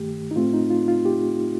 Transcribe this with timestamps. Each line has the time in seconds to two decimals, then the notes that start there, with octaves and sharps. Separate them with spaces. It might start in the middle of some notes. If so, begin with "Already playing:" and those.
Already playing: G2 D#3 A3 G4
0.31 D#4
0.36 A2 A3 C4 F4
0.53 D#4
0.70 F4
0.88 F4
1.05 G4